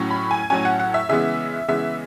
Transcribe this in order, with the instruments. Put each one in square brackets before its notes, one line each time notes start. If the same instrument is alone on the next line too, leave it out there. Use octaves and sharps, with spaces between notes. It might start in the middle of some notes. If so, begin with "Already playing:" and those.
Already playing: [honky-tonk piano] A2 F#3 C#4
B5
G#5
A2 F#3 C#4 G#5
F#5
F#5
E5
C#3 E3 G#3 B3 E5
C#3 E3 G#3 B3 E5